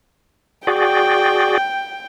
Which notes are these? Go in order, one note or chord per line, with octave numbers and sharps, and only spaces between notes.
F#4 G#4 D5 G5